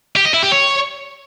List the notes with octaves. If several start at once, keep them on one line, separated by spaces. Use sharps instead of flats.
G4
D#5
E4
G4
C#5